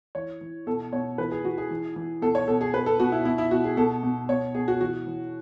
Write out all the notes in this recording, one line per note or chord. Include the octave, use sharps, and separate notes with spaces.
E3 C#5
E3
B2 A4
B2 C#5
E3 B4
G#4
E3 F#4
G#4
E3
E3
B2 A4
C#5
B2 A4
G#4
B2 B4
A4
B2 F#4
E4
B2 E4
E4
B2 F#4
G#4
B2 A4
B2
B2 C#5
B2 G#4
F#4
E3 F#4
E3